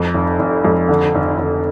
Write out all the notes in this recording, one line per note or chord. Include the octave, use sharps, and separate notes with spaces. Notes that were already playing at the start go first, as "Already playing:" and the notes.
Already playing: F2
F1
F1
F2
D3
F1
F1